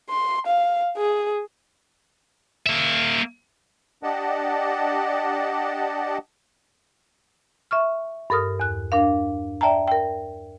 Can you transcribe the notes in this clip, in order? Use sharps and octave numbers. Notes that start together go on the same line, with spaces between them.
C6
F5
G#4
A#3 E5
D4 G4 D5 D#5 F#5 A5
E5 C#6 F6
G2 A4 A#4 D#6 F6
E2 F#6
D4 A#4 F5
D5 E5 G5 A5 A#5
A#4 G5